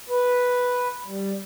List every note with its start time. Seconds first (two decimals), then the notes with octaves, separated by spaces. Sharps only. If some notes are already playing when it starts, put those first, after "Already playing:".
0.09 B4
1.06 G3